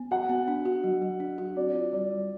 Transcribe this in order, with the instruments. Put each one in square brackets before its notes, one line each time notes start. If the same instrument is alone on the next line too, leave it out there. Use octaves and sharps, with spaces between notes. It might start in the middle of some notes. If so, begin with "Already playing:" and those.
Already playing: [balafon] B3
[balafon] F#4 [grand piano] F#5
[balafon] B3
D4
F#4
F#3
F#3
D4
F#4
[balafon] C4 [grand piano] D5
[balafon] F4
[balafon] G3 [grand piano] D5
[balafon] G3